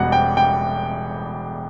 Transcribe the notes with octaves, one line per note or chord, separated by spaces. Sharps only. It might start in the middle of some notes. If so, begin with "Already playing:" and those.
Already playing: E1 E2 B2 G3 F#5
G5
G5